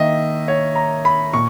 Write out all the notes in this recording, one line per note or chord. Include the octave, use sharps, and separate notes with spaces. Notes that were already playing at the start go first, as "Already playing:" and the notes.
Already playing: D#3 A#3 D#5 E5
C#5
A#5
B5
A#2 C#6